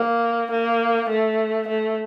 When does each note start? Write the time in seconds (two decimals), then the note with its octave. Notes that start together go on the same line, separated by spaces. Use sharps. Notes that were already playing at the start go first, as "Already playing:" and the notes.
Already playing: A#3
0.51 A#3
1.09 A3
1.68 A3